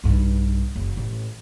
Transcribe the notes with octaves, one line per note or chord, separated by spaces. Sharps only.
B1 G2
F#1
A1